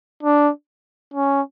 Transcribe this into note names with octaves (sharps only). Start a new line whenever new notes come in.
D4
C#4